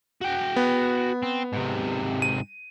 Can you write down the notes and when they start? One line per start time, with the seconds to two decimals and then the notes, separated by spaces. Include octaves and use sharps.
0.22 F#4 G5
0.56 B3
1.23 C4
1.53 G#2 C3
2.22 D#7